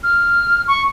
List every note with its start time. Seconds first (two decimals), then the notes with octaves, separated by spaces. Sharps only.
0.03 F6
0.68 C#6